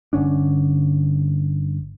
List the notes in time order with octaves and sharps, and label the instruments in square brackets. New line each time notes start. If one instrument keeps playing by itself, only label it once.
[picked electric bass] G1 D3 C#4 D4